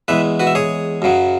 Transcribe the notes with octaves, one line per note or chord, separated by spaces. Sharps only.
E2 E3 G#3 B4 E5
F#4 B4
E5
G#4 C#5
F#2 C#3 F#3